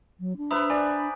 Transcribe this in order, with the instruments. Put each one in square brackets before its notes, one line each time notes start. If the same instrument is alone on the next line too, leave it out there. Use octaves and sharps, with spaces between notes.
[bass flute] F#3
D4
[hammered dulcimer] B4 C5 E5 [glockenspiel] A#5 B5 D#6
[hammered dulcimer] D5 [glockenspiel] G#5